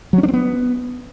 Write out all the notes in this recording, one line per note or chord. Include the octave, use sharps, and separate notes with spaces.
F#3
C#4
D4
C4
B3